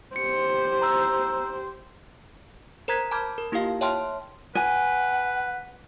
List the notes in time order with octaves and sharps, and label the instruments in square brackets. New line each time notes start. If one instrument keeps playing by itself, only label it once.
[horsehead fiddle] G4 C5 [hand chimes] C#7
[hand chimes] A#5 E6
[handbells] A#4 C5 A#5 F#6 G#6 B6
A5 B5 D6 F6 G6 G#6
A#4
A#3 E4 F4 G4 F5
C#5 E5 G5 A5 C6 F6
[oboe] B4 [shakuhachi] F#5 [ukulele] G#5